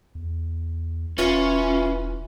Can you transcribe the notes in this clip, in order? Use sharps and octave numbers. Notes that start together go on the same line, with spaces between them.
E2
E1 E3 C#4 F4